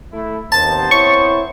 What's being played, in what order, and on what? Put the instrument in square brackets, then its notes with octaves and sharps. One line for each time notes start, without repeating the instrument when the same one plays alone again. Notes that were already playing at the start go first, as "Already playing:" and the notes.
[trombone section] A3 E4
[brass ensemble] D#2 [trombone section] B3 C4 C5 [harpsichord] A5
[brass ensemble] E4 C#5 [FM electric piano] C#6